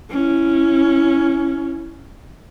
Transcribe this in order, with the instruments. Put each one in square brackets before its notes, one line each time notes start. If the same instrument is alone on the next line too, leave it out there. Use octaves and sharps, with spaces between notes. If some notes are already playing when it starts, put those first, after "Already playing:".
[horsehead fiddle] C#4 E4